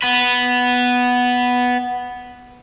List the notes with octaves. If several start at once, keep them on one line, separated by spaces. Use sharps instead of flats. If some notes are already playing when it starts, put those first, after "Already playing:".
B3 B4